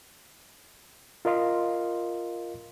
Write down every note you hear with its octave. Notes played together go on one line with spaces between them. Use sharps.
F4 A#4 D#5 F5 C6